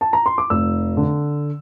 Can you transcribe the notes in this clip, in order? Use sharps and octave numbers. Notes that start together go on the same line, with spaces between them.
A5
A#5
C6
D6
F1 E6
D3